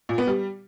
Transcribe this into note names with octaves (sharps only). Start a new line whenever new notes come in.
A#2
B3
G3